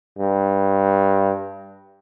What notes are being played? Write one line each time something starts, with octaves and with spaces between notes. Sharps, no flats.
G2